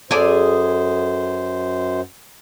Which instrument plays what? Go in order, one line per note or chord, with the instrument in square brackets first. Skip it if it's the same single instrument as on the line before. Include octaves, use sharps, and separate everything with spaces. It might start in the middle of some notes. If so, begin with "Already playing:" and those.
[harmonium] F#2 C5 [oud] G#4 A4 D5